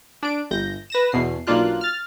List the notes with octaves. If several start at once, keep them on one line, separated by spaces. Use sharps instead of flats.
D4 D7
G1 G6 A#6
B4 A#6 E7
E2 B2 C7
B1 A#3 D4 F4 F#6
F6 A6